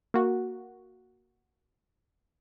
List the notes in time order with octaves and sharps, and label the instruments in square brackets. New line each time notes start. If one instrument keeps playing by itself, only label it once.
[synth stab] A#3 F#4